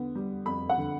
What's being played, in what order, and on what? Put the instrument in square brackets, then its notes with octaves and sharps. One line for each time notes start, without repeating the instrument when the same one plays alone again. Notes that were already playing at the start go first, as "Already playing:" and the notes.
Already playing: [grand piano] D3 B3
G3
F2 B5
F#5
D3